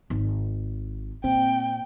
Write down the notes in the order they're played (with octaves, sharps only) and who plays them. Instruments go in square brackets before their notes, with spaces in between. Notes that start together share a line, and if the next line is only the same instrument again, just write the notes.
[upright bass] G#1
[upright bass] A#2 [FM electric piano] C4 [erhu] G5